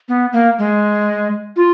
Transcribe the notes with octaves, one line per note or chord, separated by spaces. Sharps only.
B3
A#3
G#3
F4